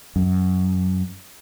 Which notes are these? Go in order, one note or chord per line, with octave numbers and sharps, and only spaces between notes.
F#2